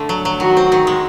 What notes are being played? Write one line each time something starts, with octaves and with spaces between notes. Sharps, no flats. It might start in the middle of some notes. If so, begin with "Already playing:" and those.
Already playing: D3 A3
F#3
F#3
D#3 F#4
C4
D#3
G#3